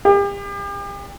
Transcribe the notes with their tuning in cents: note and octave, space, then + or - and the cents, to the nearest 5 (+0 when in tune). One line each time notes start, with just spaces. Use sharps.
G4 +40